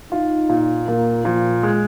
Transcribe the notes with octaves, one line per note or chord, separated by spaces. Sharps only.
D#4 F4
A#2
A#2 A#3
A#2 F3
G#3